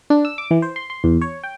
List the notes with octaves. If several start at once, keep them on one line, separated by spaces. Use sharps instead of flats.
D4
E6
D6
E3
C5
C6
C6
E2
C#5
G5